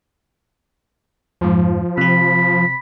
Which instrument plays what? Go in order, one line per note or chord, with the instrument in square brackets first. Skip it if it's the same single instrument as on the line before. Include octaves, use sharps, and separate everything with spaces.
[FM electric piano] F2 G#2 [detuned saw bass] F3
[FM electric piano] C3 C4 [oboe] B5